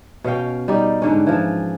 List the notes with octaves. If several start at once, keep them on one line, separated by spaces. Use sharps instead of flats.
B2 C#4 F5 G5
G3 D#4 D5
G#2 D3 C#4
E3 F3